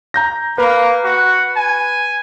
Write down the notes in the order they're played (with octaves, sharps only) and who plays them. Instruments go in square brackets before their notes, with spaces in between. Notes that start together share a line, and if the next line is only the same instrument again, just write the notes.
[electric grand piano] A#5 G6 A#6
[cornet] A#3 [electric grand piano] B4
[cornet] F#4
G#5